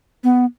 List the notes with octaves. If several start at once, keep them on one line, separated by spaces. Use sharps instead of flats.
B3